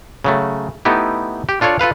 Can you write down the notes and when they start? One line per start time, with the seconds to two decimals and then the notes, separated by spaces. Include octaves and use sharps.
0.24 C#3 F#3 A3
0.85 A3 B3 D#4 E4 G4
1.49 G4
1.61 D4 F4 A4 C#5 D5
1.79 F4 A4 B4 F5